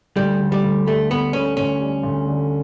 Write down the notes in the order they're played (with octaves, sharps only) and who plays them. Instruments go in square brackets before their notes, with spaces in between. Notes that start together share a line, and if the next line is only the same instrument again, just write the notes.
[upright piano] D2 [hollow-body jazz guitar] G3
[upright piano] D3
[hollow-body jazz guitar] G3
[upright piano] D2
[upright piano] G3 [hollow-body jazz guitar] A3
[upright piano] D2 [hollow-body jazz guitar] B3
[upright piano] D3 [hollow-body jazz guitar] C#4
[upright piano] D2 [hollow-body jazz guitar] C#4
[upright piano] G3
D2
D3